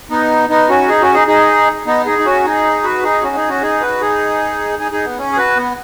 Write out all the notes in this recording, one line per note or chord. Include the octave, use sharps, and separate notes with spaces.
B3 D#4
B3 D#4
C#4 F#4
D#4 G#4
C#4 F#4
D#4 G#4
D#4 G#4
B3 D#4
D#4 G#4
D#4
C#4 F#4
D#4 G#4
F#4 B4
D#4 G#4
C#4 F#4
D#4 G#4
C#4 F#4
D#4 G#4
F#4 B4
D#4 G#4
D#4 G#4
D#4 G#4
B3
C#4
G#4
F#4 B4
B3